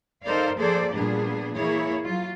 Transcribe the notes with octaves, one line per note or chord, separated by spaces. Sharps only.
D#4 A4 A#4 C5 D5 F5
F3 A#3 G#4 A4 C5 D5
A#2 G3 B3 D4 G#4
E3 A#3 E4 G#4 C#5
F#3 F4